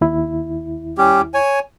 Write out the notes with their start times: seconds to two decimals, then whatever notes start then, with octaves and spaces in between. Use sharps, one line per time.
0.01 D#2 E4
0.98 G3 C#4 G4
1.34 C#5 G#5